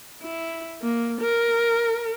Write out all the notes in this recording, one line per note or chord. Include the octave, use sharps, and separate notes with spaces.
E4
A#3
A#4